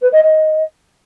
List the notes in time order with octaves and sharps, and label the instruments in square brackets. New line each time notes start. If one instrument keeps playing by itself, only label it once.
[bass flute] B4
D#5
D#5